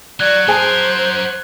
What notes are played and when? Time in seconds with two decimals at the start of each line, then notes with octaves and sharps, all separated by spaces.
0.20 F#3 F#4 D5 F#6 G#6
0.48 F#3 G#4 A#4 C5 G#5 A5